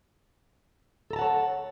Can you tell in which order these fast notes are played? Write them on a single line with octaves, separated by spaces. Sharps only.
A4 A#5 A5 F#5 C#5